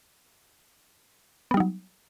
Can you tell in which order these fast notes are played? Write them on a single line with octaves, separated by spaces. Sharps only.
B3 G3 D#4 F#3